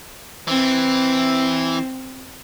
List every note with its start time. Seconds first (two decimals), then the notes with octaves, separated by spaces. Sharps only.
0.48 E3 C4